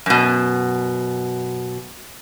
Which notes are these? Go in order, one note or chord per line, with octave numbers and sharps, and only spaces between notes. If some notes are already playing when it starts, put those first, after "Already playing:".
F#2 B2